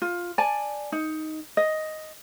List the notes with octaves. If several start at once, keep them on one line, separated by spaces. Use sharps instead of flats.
F4
D5 G#5 A5
D#4
D#5